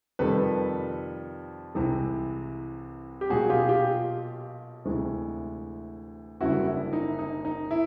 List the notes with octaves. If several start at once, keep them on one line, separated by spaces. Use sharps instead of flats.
F2 C3 D#3 G3 A4 B4
C2 C3 E3 G#3
G4
B1 A#2 F#3 F#4 G#4
F4 G4
F4 G4
D2 C3 E3 G#3
F#1 F#2 D3 G3 E4 F#4
E4
D#4
D#4
D#4
E4